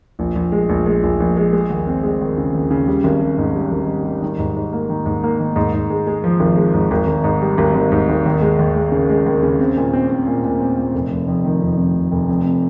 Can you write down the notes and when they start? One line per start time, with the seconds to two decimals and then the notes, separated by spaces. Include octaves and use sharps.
0.19 A#1
0.35 A#1
0.52 G#3
0.69 A#1
0.86 G#3
1.03 A#1
1.20 A#1
1.37 G#3
1.53 G#3
1.70 D#2
1.87 C4
2.03 G#3
2.21 D#2
2.38 C#3
2.55 D#2
2.71 C#3
2.87 G3
3.04 G#1
3.22 G3
3.38 G#2
3.55 G3
3.72 G#1
3.88 G3
4.05 G3
4.22 D#3
4.39 G#2
4.56 G#2
4.73 A#3
4.90 D#3
5.06 G#2
5.23 A#3
5.39 D#3
5.56 G#2
5.73 G#2
5.90 G#3
6.07 G#3
6.24 F3
6.40 G#1
6.57 G#3
6.74 G#2
6.91 G#1
7.07 G#1
7.24 G#2
7.42 G3
7.58 G#1
7.75 G#1
7.92 G#2
8.09 G#1
8.26 D#2
8.42 G#3
8.59 D#2
8.76 G#3
8.92 C#3
9.09 G#3
9.26 D#2
9.43 C#3
9.60 C4
9.76 A#2
9.93 C4
10.10 C4
10.27 A#2
10.44 A#2
10.60 C4
10.78 A#2
10.94 F1
11.10 F1
11.28 F2
11.45 D#3
11.62 F2
11.78 F2
11.95 F1
12.11 F1
12.29 F2
12.45 C3